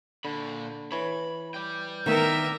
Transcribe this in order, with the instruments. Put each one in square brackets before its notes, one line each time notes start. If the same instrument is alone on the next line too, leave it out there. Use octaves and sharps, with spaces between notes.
[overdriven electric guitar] A#2 B5 [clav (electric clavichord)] D3
[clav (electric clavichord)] E3 C#5 [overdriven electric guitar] B5
[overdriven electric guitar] D5 G5
[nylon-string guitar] D#3 B3 [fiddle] A#4 E5